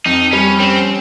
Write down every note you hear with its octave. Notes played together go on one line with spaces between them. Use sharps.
F2 D#4
G3 C#4
C4 C#4